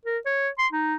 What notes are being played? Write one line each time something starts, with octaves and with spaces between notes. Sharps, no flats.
A#4
C#5
C6
D#4